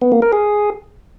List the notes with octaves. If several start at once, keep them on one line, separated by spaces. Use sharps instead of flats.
B3
A#3
A#4
G#4